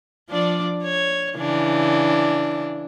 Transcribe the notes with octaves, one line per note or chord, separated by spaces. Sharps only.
F3 D4 D5
C#5
C#3 E3 D4